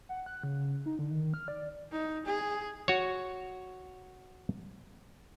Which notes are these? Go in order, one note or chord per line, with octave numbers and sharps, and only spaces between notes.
F#5
F#6
C#3
D#4
D3
D#3
F6
D5
D#4
G#4
F#4 C#5